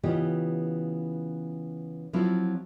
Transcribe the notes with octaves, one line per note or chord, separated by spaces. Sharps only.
C#3 E3 B3 F4 G4 D#5
F3 F#3 C4 E4 F4